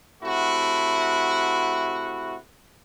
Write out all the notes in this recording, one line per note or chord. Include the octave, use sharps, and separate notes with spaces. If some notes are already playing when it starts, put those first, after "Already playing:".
C3 A3 E4 F#4